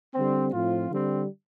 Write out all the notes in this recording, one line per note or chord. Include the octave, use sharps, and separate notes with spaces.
D3 G3 C4
A2 F3 C4 F4
D3 G3 C4